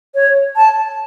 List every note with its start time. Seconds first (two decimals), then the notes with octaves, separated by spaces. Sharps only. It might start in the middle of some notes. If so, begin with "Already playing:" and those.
0.15 C#5
0.56 A5